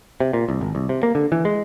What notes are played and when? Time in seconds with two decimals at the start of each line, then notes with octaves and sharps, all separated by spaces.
0.20 C3
0.33 A#2
0.49 C2
0.61 G#1
0.75 C2
0.89 C3
1.03 A#3
1.15 D3
1.32 E3
1.45 G#3